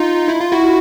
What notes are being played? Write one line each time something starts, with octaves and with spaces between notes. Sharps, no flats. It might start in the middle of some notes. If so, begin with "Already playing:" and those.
Already playing: D#4 F4
E4
F4
E4 F#4